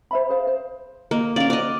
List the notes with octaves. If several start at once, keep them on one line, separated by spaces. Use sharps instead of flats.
C5 E5 B5
G#4 C5 F5
C5
A#3 D#5
C#4 A#4 D5 F5
F#4 D5 D#5